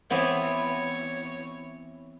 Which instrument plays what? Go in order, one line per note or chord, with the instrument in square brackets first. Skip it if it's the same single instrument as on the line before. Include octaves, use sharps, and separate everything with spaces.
[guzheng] E3 B3 C4 [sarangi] C#5